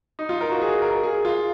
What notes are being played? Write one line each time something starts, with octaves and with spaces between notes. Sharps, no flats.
D#4
F4
A#4
F#4
G#4
A#4
G#4
F4